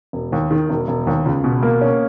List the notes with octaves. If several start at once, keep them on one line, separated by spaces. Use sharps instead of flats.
E1
D#2
D#3
E1
E1
D#2
C#2
B2
A#3
C#4